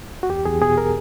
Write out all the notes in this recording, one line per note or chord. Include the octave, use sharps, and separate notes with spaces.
F#4
E2 G4
E2 G#4
B2 G#4
A#4